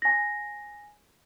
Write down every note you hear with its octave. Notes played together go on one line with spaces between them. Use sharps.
G#5 A#6